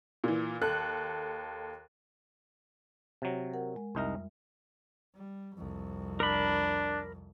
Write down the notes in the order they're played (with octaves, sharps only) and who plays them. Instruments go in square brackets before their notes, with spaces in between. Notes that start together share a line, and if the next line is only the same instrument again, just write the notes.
[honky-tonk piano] A#2 E3
D#2 A4 F#6
[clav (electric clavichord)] C3 F#3
[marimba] A#4 F#5
G#3
[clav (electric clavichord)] C2 D#4 A#4 [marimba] F2 G3 E5
[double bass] G3
C2 F2
[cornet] D4 [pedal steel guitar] A#4 B5